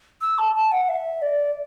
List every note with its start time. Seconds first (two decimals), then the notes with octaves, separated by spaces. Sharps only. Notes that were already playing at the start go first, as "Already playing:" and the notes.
0.21 E6
0.38 A5
0.55 A5
0.72 F#5
0.89 E5
1.22 D5